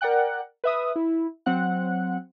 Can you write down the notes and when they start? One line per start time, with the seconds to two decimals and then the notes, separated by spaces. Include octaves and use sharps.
0.01 A#4 D5 F#5 G5 F#6
0.64 B4 E5 D#6
0.96 E4
1.46 F#3 C4 F#5 F#6